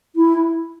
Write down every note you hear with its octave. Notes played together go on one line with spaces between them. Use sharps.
E4